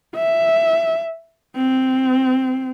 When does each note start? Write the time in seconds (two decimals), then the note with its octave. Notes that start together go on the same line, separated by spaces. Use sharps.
0.16 E5
1.56 C4